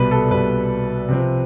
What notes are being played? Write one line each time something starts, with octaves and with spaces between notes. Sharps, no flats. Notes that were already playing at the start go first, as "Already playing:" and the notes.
Already playing: C2 B2 G3 B3 B4
A4
C2 B2 G3 B3 B4
C3 F3 C4